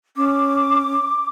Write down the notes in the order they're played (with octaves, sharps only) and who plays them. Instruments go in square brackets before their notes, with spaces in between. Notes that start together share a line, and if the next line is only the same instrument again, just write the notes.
[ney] C#4 [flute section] D6